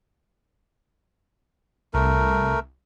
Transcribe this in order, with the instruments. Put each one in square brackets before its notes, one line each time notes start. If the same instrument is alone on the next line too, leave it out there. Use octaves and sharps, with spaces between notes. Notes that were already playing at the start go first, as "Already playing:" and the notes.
[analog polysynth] C2 [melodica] A3 A#4